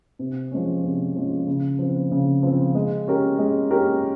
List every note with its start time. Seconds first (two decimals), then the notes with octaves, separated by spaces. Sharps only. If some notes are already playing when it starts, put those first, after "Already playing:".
0.19 C3
0.52 F3 G#3 C#4
0.84 C3
1.16 F3 G#3 C#4
1.47 C#3
1.79 F3 C4
2.11 C#3
2.43 F3 C4
2.75 G#3
3.08 C#4 G4 A#4
3.39 G#3
3.71 C#4 G4 A#4